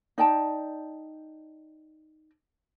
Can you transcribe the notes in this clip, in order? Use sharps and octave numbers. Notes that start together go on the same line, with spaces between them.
D#4 D5 G5 A5